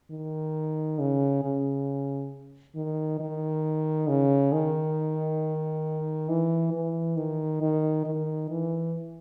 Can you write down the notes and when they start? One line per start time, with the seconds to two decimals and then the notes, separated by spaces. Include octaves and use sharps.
0.11 D#3
0.99 C#3
1.43 C#3
2.75 D#3
3.20 D#3
4.08 C#3
4.53 D#3
6.29 E3
6.73 E3
7.17 D#3
7.62 D#3
8.06 D#3
8.50 E3